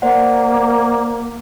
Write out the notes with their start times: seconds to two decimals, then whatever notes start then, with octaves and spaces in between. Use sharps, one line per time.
0.02 A#3 C5 D5 F#5